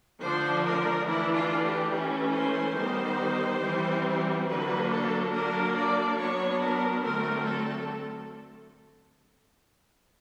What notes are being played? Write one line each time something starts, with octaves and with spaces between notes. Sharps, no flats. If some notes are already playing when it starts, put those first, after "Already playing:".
D3 F3 A3 D4 C5
A#4
E3 A3 D4 E4
F4
G4
E3 A3 C#4
C5
D#3 G3 B3
E3 G3 C4
D3 F#3 A#3 D4 B4
A4
F#3 A#3 D4 A#4
D5
F#3 B3 D4 C#5
A#4
D3 F#3 A3 C4 A#4
A4